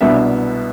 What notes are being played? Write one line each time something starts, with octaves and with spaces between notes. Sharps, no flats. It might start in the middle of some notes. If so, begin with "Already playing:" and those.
C2 B2 B3 D4 E5